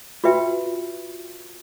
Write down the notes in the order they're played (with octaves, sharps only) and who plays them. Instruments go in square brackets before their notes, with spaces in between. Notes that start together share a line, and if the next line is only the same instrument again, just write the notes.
[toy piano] F4 F#4 B4 E5 G5